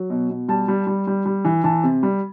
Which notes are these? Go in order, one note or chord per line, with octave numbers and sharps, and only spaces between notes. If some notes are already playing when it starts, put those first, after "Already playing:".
Already playing: F#3
B2
B2
G3 A5
G3
G3
G3
G3
E3
E3 A5
C3
G3